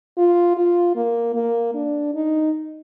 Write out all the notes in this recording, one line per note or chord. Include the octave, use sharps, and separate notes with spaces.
F4
F4
A#3
A#3
D4
D#4